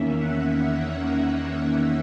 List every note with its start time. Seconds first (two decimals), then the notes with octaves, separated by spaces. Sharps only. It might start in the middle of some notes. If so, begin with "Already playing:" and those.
Already playing: E2 D#3 A#3 C#4 E5
0.16 F#5